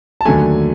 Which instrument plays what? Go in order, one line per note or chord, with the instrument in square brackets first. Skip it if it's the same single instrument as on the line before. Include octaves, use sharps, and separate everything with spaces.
[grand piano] A5
D#2 D3 F#3 A3 G#5